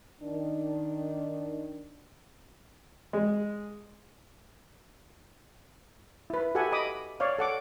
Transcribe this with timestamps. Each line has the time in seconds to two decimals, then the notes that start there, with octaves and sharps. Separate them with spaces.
0.22 D#3 D4
3.13 G#3
6.30 E4 B4
6.55 F#4 G4 A4 E5 F#5 G#5
6.72 D#5 B5 D6 D#6
7.20 C#5 D5 F5
7.39 A4 F#5 D6